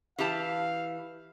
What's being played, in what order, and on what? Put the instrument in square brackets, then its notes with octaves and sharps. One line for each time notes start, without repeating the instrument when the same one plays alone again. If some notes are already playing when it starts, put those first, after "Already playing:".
[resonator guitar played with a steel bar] E3 G4 A5 [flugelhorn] F5